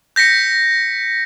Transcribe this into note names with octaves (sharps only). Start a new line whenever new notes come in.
G6 A#6 B6 C#7